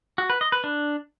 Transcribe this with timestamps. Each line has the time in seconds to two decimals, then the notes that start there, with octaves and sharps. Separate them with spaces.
0.18 F#4
0.30 B4
0.41 D#5
0.52 B4
0.64 D4